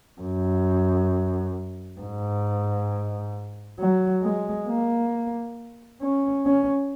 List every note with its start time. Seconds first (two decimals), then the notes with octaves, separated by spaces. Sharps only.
0.21 F#2
2.01 G#2
3.79 F#3
4.23 G#3
4.68 A#3
6.02 C#4
6.46 C#4